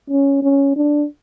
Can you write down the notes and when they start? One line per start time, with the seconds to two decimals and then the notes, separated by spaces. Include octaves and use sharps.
0.10 C#4
0.43 C#4
0.76 D4